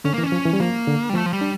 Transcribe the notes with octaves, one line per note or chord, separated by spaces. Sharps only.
D3 C#4
E3 A#3
C#4
F3
E3
G3
F3 A#3
D3
G3
F3 A3
F3
G3
D4